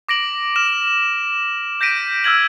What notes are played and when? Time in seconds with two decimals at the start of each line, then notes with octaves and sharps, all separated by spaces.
0.09 D6 A#6 D7 F#7
0.56 F6 E7
1.81 G6 A#6 B6 D7 D#7
2.24 E6 F6 G#6 F#7